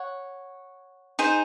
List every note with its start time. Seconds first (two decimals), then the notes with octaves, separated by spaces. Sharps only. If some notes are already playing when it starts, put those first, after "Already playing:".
Already playing: C#5 F#5
1.19 D#4 G#4 C5